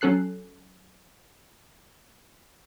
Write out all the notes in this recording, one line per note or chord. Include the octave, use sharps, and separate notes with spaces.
F#3 C#4 A4 F#6 C7